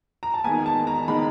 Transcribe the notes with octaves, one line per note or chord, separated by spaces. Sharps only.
A#5
A5
D#3 G#3 B3 G#5
A5
A#5
D#3 G#3 B3 B5